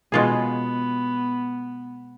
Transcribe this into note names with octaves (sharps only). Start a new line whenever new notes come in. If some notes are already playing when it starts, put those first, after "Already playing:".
B2 G#3 B3 C#4 F4 G#4